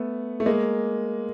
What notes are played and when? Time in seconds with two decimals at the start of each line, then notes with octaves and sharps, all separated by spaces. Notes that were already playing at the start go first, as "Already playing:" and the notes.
Already playing: A3 B3
0.40 A3
0.46 G#3 A#3